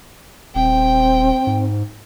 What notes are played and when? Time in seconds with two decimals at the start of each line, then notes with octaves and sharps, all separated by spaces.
0.55 D#1 C4 G5
1.47 G#2